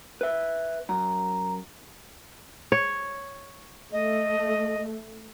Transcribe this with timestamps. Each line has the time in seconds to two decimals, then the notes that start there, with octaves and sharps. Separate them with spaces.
0.21 B4 E5
0.89 F#2 A#5
2.72 C#5
3.92 A3 D#5